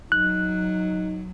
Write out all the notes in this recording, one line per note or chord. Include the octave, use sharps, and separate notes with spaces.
F#3 D#4 F#6